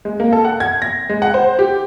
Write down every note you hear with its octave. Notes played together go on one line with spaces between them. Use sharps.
G#3
A#3
A4
F#5
G#6
A#6
G#3
F#5
C5
G4